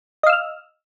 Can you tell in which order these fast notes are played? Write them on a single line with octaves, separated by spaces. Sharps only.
D#5 F5 E6 F6